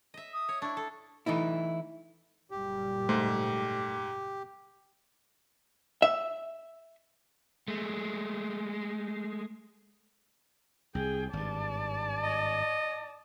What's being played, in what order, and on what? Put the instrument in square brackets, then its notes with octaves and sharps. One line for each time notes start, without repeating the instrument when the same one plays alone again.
[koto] D#5 E5
[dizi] D#6
[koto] C#5
[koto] D4 E4 [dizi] C#6
[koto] A4
[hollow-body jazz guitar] E3 A3 D#4 E4
[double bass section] F#1 A#2 G3 [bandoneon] G4
[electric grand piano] G#2 [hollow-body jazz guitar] A3 C5
[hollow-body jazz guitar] E5
[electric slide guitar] G#3 A3
[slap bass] C2 [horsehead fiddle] G#4 G5
[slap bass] G#1 G2 [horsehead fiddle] D5 A5
[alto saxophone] D#5